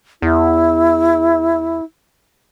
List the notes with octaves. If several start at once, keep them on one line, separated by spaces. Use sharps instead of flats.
E2 E4